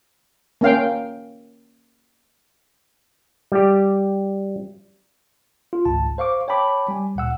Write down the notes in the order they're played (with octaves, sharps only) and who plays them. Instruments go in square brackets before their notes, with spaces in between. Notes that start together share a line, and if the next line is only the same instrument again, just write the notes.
[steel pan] A#3 C#4 F5 G5
[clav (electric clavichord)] G3 G4
[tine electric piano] F4
G#1 C#2 G#2 G#3 A5
C5 F5 C#6 D6
C#5 G5 A5 B5 D6
G3 G#5
D2 A#2 F#5 E6